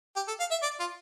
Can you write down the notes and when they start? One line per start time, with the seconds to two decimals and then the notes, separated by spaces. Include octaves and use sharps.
0.16 G4
0.28 A4
0.40 F5
0.51 E5
0.63 D5
0.80 F4